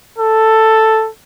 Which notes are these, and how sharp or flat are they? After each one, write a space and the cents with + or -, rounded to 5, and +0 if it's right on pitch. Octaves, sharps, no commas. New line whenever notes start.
A4 +5